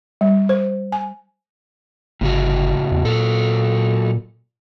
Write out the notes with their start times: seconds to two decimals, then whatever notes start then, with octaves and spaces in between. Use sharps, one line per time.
0.21 G3
0.49 C5
0.92 G#5
2.21 G1 A2 C#3 F#4
2.91 E2
3.05 A#2 F#3 A4